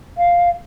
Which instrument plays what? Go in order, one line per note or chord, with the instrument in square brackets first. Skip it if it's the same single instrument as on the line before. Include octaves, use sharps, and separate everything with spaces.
[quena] F5